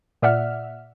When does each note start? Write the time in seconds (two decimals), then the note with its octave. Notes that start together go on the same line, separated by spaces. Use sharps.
0.22 A#2 D5 E5 F#5 F6